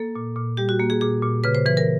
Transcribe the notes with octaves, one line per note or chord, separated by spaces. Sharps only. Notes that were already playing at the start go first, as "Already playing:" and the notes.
Already playing: A#3 A4
A#2
A#2
G3 G4
F#4
A#3
G#4
A#2 G#4
A#2
C#3 B4
C5
E3 B4
A#4